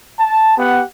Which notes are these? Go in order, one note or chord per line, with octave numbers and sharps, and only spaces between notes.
A5
B3 G4 F#5